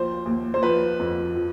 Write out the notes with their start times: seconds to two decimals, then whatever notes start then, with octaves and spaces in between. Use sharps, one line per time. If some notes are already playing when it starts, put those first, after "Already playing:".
Already playing: D#2 F3 C5
0.26 D#2
0.54 C5
0.63 F3 B4
1.00 F2
1.36 F3